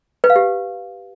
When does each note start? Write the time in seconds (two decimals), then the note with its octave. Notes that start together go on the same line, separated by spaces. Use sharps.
0.24 B4
0.30 F5
0.36 G4